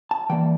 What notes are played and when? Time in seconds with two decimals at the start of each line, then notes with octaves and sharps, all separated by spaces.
0.11 A5
0.29 E3 G3 A#3 G5